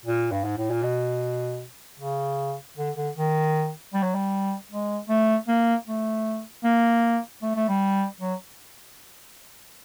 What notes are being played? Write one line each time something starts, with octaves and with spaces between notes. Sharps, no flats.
A#2
G2
G#2
A2
A#2
B2
C#3
D3
D3
D#3
G3
F#3
G3
G#3
A3
A#3
A3
A#3
A3
A3
G3
F#3